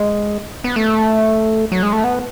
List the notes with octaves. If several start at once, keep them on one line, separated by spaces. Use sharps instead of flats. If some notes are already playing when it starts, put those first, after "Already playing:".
Already playing: G#3
B3
A3
F#3
G#3
A3
B3